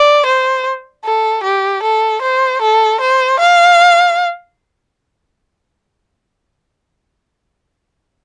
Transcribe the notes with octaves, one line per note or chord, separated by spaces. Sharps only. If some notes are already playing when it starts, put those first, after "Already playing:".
Already playing: D5
C5
A4
G4
A4
C5
A4
C5
F5